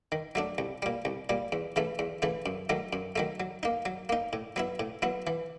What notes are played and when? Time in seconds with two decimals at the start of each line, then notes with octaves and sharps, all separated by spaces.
0.12 D#3
0.35 F#3 A3 D4
0.58 C2
0.82 A#2 G3
1.05 C2
1.29 A#2 G3
1.52 E2
1.76 C#3 E3 A3
1.99 E2
2.22 C#3 E3 A3
2.46 F#2
2.69 D#3 F#3 A3
2.93 F#2
3.16 D#3 F#3 A3
3.40 F#3
3.63 A#3 D#4
3.85 F#3
4.09 A#3 D#4
4.33 A2
4.56 F#3 B3 E4
4.79 A2
5.02 F#3 B3 E4
5.27 E3